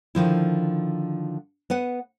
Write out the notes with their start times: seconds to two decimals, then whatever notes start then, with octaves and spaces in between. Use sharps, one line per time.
0.15 D3 D#3 F3 E4
1.70 B3 B4 F#5